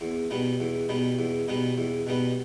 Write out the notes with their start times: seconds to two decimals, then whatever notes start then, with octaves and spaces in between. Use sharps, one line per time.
0.01 E2
0.31 B2 G3 B3 D#4
0.60 E2
0.89 B2 G3 B3 D#4
1.19 E2
1.48 B2 G3 B3 D#4
1.78 E2
2.07 B2 G3 B3 D#4